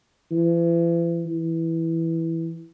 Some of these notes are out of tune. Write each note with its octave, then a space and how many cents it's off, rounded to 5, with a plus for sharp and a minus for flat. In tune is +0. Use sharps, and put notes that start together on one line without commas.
E3 +40
E3 -5